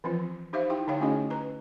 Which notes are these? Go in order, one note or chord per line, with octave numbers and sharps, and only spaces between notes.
E3 F3 C4 F4
D#4 G4 C5 E5 F5
D#4 E4 G4 G5
D3 D#4 E4 C#5 F5 G5
A3 C#4 F#4 G#4 D#5
B4 A#5